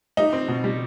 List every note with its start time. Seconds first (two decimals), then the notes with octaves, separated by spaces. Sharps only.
0.17 G3 D#4
0.33 C4
0.48 B2
0.64 G3